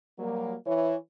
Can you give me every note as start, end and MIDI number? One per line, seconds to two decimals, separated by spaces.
0.18 0.55 54
0.18 0.55 55
0.18 0.55 58
0.67 0.96 52
0.67 0.96 73